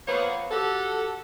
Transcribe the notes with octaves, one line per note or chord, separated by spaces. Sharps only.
F3 A#3 B3 C5 C#5
F#4 G4 A4